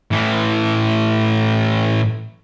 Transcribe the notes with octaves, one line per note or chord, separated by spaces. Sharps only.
A2 E3